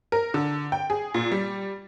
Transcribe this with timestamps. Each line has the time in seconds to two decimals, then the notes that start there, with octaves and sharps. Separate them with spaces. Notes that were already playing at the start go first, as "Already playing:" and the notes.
0.12 A#4
0.34 D3
0.72 G5
0.90 G#4
1.14 A#2
1.32 G3